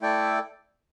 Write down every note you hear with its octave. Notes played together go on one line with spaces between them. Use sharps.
A3 E4 A4 D5 G5